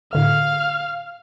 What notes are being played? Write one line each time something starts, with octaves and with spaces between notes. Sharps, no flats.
A2 D3 A3 F5 F6